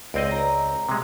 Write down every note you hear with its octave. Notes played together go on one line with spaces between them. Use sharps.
C#2 C4 D5 D#5
A#5
C3 G#3